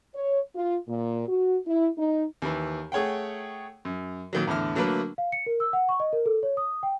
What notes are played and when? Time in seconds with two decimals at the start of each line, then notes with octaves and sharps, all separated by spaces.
0.14 C#5
0.55 F4
0.88 A#2
1.28 F#4
1.67 E4
1.98 D#4
2.42 D#2 E3
2.92 A3 G#4 C#5 F#5 G5
3.85 F#2
4.33 A#2 D#3 F#3
4.47 E2 A2 D3 F6
4.75 D3 F#3 A3 A#3 A#4 B4
5.18 F5
5.32 C#7
5.46 A#4
5.60 E6
5.73 F#5
5.89 C#6
6.00 D#5
6.13 A#4
6.26 A4
6.43 C#5
6.57 D#6
6.83 G5